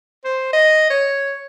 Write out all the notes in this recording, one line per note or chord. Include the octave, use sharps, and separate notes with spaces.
C5
D#5
C#5